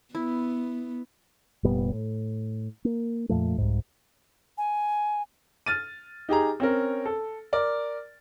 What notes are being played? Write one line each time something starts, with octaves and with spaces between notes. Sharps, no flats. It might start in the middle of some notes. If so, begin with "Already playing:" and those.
B3 E4
F1 A#2 G3 B3
A2
A#3
F2 A#2 F3 A3
C2 G#2
G#5
F6 A6 D#7
D#4 G4 G#4 A#5
C4 C#4 A#4
A4
A#4 D5